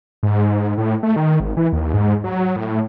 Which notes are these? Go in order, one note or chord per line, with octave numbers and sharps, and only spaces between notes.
G#2
A2
A3
D#3
G#1
E3
D#2
G#2
F#3
A2